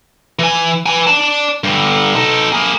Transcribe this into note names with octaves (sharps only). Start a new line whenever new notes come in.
E3 G#5
B4 G#5
D5 A5
G2 D3
D#4 A4
A#3 G#4